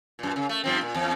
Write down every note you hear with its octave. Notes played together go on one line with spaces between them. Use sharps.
F#2 A#2
C#3
A3
G2 F3 C4
A#2
E2